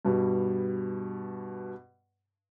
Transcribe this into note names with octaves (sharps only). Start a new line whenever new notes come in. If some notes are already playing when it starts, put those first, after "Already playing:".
G2 B2